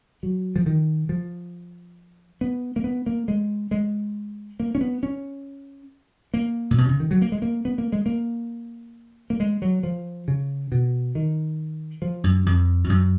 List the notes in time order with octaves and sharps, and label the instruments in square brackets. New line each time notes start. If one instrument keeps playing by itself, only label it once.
[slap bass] F#3
F3
D#3
F3
B3
A#3
B3
A#3
G#3
G#3
A#3
C#4
B3
C#4
A#3
A#2
B2
C#3
D#3
F#3
A#3
G#3
A#3
B3
A#3
G#3
A#3
A#3
G#3
F#3
F3
C#3
B2
D#3
F3
F#2
F2
F2
F#2